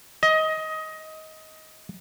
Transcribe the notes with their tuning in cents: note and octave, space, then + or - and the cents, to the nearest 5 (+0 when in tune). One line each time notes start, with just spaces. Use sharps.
D#5 +20